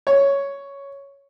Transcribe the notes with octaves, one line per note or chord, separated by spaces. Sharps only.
C#5